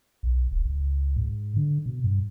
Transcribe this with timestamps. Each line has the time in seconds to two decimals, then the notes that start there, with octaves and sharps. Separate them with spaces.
0.23 B1
0.52 D1
0.65 C#2
1.16 G#2
1.56 D3
1.86 B2
2.04 G2